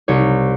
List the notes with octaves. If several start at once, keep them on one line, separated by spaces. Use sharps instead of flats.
C2 C#5